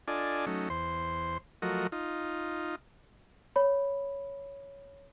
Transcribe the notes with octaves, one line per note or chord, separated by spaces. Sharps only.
D4 F4 A4 D5 D#5 G#5
F#3 A3 C#4 D#4
E2 C5 C6
F3 F#3 A3 F#4 A#4 D#5
D#4 F4
C#5 B5